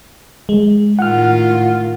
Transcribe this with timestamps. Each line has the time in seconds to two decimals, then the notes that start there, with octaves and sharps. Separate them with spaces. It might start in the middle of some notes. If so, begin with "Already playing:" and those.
0.49 G#3
0.99 A2 D#3 F4 F#5 F6